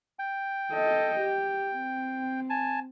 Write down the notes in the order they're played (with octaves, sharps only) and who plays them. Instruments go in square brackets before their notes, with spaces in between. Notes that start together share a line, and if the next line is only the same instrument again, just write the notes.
[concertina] G5
[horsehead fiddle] A4 D#5
G4
C4
[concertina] G#5 A5